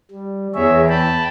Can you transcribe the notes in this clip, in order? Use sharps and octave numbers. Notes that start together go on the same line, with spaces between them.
G3
E2 G#4 C#5 E5
G5 A5 B5